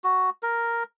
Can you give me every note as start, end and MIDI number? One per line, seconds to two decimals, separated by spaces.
0.04 0.30 66
0.43 0.83 70